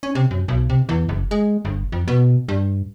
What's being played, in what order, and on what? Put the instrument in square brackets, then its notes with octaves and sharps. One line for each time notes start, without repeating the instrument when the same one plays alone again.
[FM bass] C#4
C3
F#2
B1
C3
E2
F#1
G#3
G1
F2
B2
G2